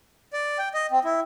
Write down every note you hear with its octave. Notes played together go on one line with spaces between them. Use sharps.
D5
G5
D#5
C4
E4